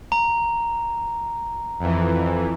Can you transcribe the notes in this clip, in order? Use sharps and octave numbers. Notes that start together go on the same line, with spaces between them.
A#5
F2 E3